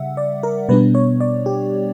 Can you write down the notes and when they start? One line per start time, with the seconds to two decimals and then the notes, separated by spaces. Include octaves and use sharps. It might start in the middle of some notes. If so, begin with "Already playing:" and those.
Already playing: C#3 G3 E5 F#5
0.17 D5
0.43 A#4
0.69 B2 G3 B3 D4 B4
0.95 C#5
1.20 D5
1.46 G4